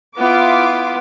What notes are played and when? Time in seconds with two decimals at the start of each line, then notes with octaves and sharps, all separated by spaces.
0.18 B3 E4 F4 D6